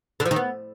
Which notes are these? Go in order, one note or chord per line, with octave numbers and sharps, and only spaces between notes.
D3
F3
D#3
B3